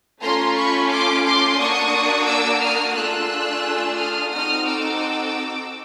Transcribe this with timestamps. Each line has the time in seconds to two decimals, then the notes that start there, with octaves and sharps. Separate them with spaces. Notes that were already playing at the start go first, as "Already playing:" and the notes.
0.22 A3 C#4 F4 A#5 C6
0.56 B5 C#6
0.90 C6 D6
1.24 C6 D6
1.58 A#3 D4 F#4 C#6 D#6
2.27 D6 E6
2.61 D#6 F6
2.94 A3 D4 F4 G#4 E6 F#6
3.98 D#6 F6
4.32 C4 D#4 F#4 A4 D#6 F6
4.66 D6 E6